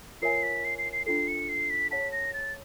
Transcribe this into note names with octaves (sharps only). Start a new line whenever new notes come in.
F4 A#4 C#5 E5 G#5 C7
B6
C7
C7
C7
D4 F4 A4 C7
C#7
C7
B6
G#4 C#5 F#5 A5 B6
A#6
A6